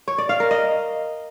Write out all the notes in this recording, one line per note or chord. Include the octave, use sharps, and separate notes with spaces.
C#5
D5
F5
A#4
D#5